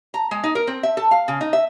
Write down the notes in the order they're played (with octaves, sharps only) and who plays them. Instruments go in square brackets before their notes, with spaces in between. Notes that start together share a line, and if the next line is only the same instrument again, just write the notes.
[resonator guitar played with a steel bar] A#5
G#3
D#4
A#4
C4
E5
A4
F5
C#3
D#4
E5